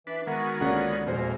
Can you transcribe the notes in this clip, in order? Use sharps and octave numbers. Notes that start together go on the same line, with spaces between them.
E3 D4 B4
D#3 G#3 B3 F#4 A#4
C#2 D3 A#3 C#4 F#5
E1 F2 A#2 G#3 C5